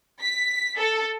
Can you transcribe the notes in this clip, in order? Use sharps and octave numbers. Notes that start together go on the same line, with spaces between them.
B6
A4